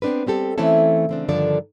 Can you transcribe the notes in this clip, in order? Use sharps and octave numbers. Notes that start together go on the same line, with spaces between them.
B3 C4 D4 A#4 B4
G3 C4 G4 A4
E3 A3 C4 C#4 E4 A4
C#3 C4 D4
G2 D3 D#3 F3 A4 D5